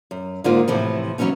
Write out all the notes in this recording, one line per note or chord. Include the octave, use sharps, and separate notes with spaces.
F#2
G#2 D3 G#3 A#3 D#4 F4
A2 C3 E3 F3
E3 F#3 A3 B3 C#4 D#4